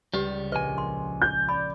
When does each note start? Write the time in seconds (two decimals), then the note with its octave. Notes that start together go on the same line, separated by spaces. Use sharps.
0.14 C#2 G3 G4 B4 D5
0.52 A#1 B4 D#5 G#5
0.78 C6
1.22 G6
1.49 D5 B5